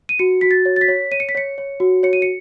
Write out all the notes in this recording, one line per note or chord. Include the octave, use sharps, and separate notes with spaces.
D#7
F#4 C#7
F#4 B6
A6
C#5
A6
B6
C#5
C#5 D#7
C#7
B6
C#5 C#7
C#5
F#4
C#5 C#7
D#7
C#7